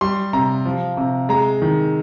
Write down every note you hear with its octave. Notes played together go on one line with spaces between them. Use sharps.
G3 C6
C3 A#5
F3
C3
G#3 A#5
D#3